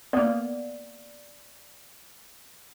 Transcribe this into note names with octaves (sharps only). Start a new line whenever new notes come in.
A#3 B3 D5